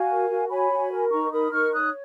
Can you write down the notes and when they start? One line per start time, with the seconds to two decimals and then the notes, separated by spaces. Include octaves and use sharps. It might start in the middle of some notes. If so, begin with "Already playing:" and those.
Already playing: F#4 F5 G#5
0.09 A#4
0.30 F#4
0.50 C#5 G#5 B5
0.71 F#4
0.92 A#4
1.12 D#4 A#5 C#6
1.32 A#4 B5 D#6
1.52 D#4 C#6 F6
1.73 C#5 D#6 F#6